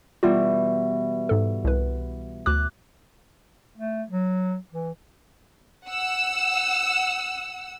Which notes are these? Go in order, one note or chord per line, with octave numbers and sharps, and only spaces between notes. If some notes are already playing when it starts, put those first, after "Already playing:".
B2 E3 G3 F4
G#2 A4
C2 B4
D2 D6 F#6
A3
F#3
E3
F#5 E6